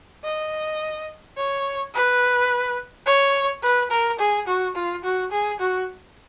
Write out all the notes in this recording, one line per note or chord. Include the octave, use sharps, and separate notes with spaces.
D#5
C#5
B4
C#5
B4
A#4
G#4
F#4
F4
F#4
G#4
F#4